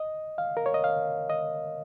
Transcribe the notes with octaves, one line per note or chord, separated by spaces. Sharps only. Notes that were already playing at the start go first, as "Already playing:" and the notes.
Already playing: D#5
F5
A#4
C#5
D#5
F5
D#5